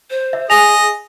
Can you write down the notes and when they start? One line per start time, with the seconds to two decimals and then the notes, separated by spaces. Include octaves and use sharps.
0.10 C5
0.33 E5
0.50 G#4 D#5 G#5 A#6 F7